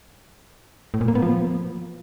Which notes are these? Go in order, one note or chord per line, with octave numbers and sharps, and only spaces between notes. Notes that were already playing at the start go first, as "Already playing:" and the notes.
A2
A#2
A#3
B3
F3